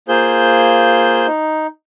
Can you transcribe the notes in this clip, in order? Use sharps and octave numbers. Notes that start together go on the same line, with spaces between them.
A#3 F4 G#4 C5 G6
D#4